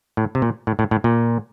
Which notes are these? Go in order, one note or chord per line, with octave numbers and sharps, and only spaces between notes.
A2
C3
A#2
A2
A2
A2
A#2